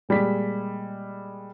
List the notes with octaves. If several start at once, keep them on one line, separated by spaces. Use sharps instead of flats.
A#2 G3 G#3 B6